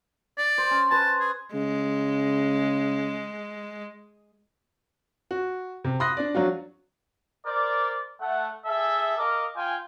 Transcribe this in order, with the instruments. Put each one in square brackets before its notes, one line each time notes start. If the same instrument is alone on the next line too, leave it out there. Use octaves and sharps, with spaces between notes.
[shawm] D5
[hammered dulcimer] C5
C#4
[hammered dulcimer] B4 C5 G#5 [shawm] A5
[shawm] G#4
[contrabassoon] C#3 [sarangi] G#3
[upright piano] F#4
C3
B5 C6 D#6 F#6 A#6
D4 D5
F3 F#3 D4 F4 F#4
[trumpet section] A#4 C5 D5
A3 F#5
G#4 A4 E5
A#4 D#5 F5 D6
F4 G5 G#5